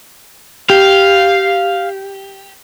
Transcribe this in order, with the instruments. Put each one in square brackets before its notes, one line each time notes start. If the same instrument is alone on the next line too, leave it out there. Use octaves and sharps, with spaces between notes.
[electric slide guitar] G4 [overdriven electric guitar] F5